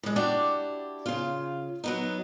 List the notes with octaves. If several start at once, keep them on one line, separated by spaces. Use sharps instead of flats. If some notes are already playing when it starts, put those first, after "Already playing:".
A2 G#3
D4 E4 F#4 G4 D5
C#3 F4
F#3 B3 D#4